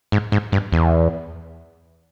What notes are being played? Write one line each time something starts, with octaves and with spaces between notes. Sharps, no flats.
G#2
G#2
G2
E2